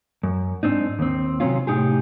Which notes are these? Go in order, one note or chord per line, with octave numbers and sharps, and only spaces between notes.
F#2
G#2 C4 D4 D#4
D#2 C4
C3 D#3 F#3 C4 C#4 F4
A2 C3 F3 D#4 G4 G#4